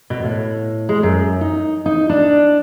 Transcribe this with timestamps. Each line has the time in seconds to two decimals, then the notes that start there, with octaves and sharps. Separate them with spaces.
0.10 B2
0.24 A2
0.89 G#3
1.03 F#2
1.41 D#4
1.86 D#4
2.09 D4